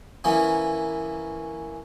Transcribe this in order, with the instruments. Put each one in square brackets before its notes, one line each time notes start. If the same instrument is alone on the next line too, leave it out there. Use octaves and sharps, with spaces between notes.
[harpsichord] E3 A#3 B3 C#4